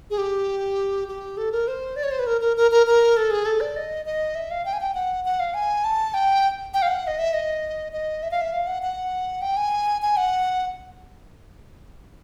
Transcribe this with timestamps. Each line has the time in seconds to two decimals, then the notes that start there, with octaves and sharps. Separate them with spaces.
0.10 G#4
0.18 G4
1.08 G4
1.37 A4
1.52 A#4
1.68 C5
1.96 D5
2.04 C#5
2.11 C5
2.19 B4
2.27 A#4
2.41 A#4
2.57 A#4
2.71 A#4
2.87 A#4
3.17 A4
3.31 G#4
3.45 A4
3.61 D5
3.76 D#5
4.06 D#5
4.35 E5
4.51 F5
4.65 G5
4.73 G#5
4.80 G5
4.94 F#5
5.25 F#5
5.40 F5
5.54 G#5
5.84 A5
6.14 G5
6.74 G5
6.82 F5
6.88 F#5
7.07 D#5
7.19 E5
7.33 D#5
7.92 D#5
8.23 E5
8.31 F5
8.41 E5
8.52 F5
8.67 F#5
8.83 F#5
9.42 G5
9.57 G#5
10.02 G#5
10.17 F#5